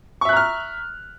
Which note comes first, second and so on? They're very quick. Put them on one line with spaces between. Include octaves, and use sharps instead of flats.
C#6 E5 F#6 A#5 F6